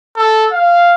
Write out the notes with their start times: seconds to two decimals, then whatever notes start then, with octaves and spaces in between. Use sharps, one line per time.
0.17 A4
0.51 F5